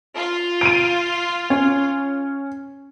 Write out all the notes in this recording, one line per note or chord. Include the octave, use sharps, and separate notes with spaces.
F4
D7 D#7
C#4